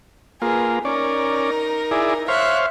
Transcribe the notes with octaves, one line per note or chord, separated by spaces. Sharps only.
A#3 F4 G#4 B4
C#4 D#4 A#4 D5
E4 G#4 D5
C5 C#5 E5 F5 F#6